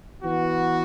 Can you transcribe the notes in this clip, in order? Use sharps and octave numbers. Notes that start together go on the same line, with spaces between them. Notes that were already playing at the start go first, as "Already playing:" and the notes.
E3 B3 F#4